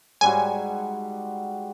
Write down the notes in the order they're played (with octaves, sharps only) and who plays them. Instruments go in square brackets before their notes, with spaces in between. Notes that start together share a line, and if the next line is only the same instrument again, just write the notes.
[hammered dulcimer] G#2 G3 F#4 [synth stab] G#5